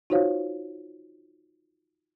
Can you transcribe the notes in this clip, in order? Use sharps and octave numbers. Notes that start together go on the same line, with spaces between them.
D#4 F4 F#4 C5 C#5 F5